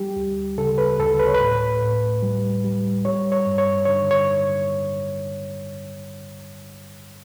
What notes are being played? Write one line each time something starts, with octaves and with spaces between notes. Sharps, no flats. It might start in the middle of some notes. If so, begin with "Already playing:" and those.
Already playing: G3 G4
D2
C#3 A4
B4
D2 A4
B4
C#5
B4
A2
A2
G3
G3
G3 C#5
C#5
G2
C#5
D3 C#5
C#5